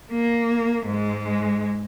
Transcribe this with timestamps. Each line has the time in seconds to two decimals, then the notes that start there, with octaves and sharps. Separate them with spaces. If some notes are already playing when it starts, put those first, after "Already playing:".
0.12 A#3
0.87 G#2 G#3